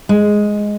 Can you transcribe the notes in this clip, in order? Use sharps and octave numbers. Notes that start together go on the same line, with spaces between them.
G#3